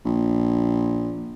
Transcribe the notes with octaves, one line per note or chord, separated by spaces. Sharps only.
A#1